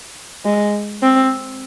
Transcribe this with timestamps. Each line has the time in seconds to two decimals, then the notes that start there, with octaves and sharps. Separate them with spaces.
0.45 G#3
1.02 C4